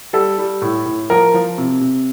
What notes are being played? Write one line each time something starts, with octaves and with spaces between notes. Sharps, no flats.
G3 A4
G3
A2
A2
F3 A#4
F3
C3
C3